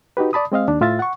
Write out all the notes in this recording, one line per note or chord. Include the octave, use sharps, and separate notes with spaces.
D#4 F#4 G4 B4
D5 A5 B5 D#6
G#3 C4 D#5 F5
D#2 D4
A2 F4 E5 A6
F#5 C#6